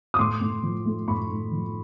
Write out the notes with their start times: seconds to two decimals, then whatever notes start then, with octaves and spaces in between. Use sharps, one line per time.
0.14 D#6
0.19 A2 C6 D6
0.41 A2
0.63 F3
0.86 A3
1.08 A2 B5 C#6
1.30 A2
1.52 F3